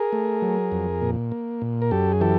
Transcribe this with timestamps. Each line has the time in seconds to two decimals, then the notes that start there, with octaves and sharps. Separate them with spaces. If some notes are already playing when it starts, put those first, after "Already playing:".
Already playing: G#4 A#4
0.13 A3
0.42 F#3
0.72 F2
1.01 A#2
1.32 A#3
1.62 A#2
1.82 A#4
1.91 F#2 G4 A4
2.12 G#4
2.21 E3 G4 A4